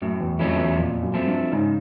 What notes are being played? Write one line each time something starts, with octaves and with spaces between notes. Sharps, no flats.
F#2 A2
E2
F2 F#3 A3 C#4 E4
E2
F2 A#2
F#2
F3 A3 C4
G2
G#2 C#3